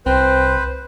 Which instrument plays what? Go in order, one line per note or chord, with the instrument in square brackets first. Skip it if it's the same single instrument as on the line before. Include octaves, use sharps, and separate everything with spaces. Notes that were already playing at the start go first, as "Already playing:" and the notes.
[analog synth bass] C2 [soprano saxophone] C4 [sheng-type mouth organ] B4 C5